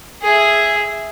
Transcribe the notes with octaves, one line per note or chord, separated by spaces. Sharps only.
G#4 E5